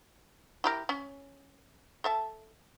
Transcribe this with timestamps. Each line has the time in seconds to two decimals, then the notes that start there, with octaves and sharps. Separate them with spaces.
0.64 E4 G4 A#4
0.89 C#4
2.04 A4 E5 A5